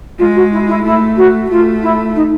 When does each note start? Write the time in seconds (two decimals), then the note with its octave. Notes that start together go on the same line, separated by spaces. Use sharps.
0.19 G#3 F4
0.36 F#4
0.52 E4
0.68 E4
0.84 A3 E4
1.17 F#4
1.49 A3 F4
1.82 E4
2.15 D#4